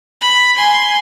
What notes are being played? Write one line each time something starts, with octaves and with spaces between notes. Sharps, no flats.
B5
G#5 C6